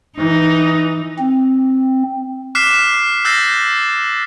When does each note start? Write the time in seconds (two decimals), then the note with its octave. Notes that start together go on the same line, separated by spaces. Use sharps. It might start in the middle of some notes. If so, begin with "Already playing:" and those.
0.18 E3 D#4
1.19 C4
2.55 D6 F6 F#6 B6 C7 E7
3.25 E6 F#6 G6 A6 A#6 C7